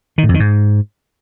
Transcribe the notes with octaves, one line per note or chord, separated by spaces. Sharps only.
D#3
A2
F2
D#3
G#2